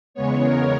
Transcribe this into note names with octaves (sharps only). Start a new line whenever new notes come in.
E2 C#3 G#3 B3 C#5
A#4